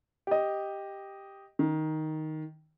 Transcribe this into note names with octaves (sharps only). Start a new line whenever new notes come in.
G4 D#5
D#3